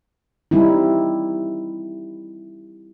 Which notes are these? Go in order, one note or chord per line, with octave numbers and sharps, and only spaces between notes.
G3 C4 D#4 E4